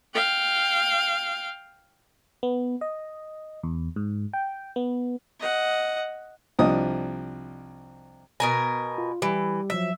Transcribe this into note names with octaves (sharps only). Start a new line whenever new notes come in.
F5 G5
B3
D#5
E2
G#2
G5
B3
D#5 F#5
C2 F3 D4 D#5 D#6
B2 A#4 G#5 B5 A#6
F4
E3 G3 G4
F3 F#3 E5 B6